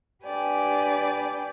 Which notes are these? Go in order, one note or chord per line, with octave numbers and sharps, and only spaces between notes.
D4 G4 B4 D5 G5 G#5